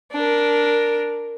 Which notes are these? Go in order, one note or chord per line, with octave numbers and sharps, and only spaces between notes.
D4 A#4